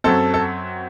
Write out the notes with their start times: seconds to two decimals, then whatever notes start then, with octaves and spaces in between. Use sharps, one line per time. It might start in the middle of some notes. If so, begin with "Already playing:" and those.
0.04 F#2 F#3 C4 A4
0.34 A4